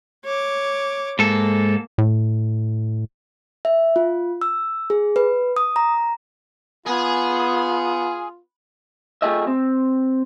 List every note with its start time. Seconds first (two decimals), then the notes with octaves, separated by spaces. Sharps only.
0.25 C#5 D6
1.19 G#2 A#3 A4
1.98 A2
3.65 E5
3.96 F4
4.41 E6
4.90 G#4
5.16 B4
5.56 D#6
5.76 A#5
6.86 B3 F4 G#4
9.22 A3 F4 G4 G#4 D#5 E5
9.47 C4